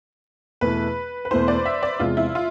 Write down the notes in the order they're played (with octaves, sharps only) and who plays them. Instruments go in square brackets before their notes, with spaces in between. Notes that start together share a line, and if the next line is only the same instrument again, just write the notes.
[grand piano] E2 B2 A3 E4 [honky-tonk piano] B4
[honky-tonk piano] B4
[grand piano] E2 B2 A3 E4 [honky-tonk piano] C5
[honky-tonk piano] D5
E5
D5
[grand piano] E2 C3 G#3 [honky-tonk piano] F4
[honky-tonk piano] E4
F4